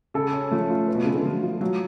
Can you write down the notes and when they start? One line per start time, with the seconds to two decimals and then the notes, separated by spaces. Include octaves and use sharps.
0.14 C#3 A4
0.33 C#4
0.51 F3 A3
0.70 F4
0.88 B4
0.95 B2
1.04 C#3 A3
1.14 D3
1.25 F3 F#3
1.43 F4
1.61 F#3 F4